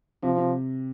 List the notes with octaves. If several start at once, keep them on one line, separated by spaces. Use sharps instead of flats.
C3 F3
C3